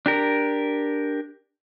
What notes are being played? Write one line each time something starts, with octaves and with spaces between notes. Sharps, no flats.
D4 G4 A#4